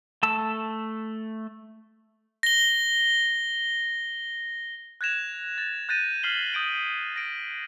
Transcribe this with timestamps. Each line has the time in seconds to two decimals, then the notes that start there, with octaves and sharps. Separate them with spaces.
0.23 A3 A5 E6
2.43 A#6 G7
5.01 F#6 G#6 A#6 E7 F7
5.58 A6
5.89 F#6 G6 A6 A#6 D#7
6.23 F6 B6 C7 F#7 G7
6.53 D#6 G6 D7 F#7
7.16 A#6 D7